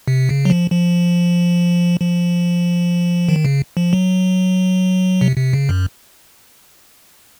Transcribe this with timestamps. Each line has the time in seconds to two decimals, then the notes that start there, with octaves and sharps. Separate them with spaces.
0.08 C3
0.29 C#3
0.45 F#3
0.50 F3
0.72 F3
2.00 F3
3.29 D#3
3.45 C#3
3.77 F3
3.93 F#3
5.21 C3
5.37 C3
5.53 C#3
5.69 F#2